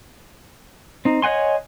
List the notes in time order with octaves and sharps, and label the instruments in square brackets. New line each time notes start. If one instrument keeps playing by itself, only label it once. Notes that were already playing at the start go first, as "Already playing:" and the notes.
[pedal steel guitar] C4 D#4
C#5 D#5 F#5 G#5 C6